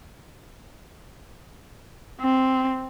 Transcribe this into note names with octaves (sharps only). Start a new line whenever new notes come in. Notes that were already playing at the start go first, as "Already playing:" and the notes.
C4